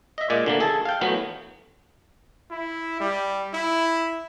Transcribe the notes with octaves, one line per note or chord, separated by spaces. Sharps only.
D#5 E5
A#2 G#3 D5
D3 E3 A#3
G#4 A4 A5
F5 G5
E3 F#3 A3 B3
E4
G3
E4